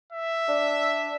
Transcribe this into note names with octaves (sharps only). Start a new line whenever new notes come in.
E5
D4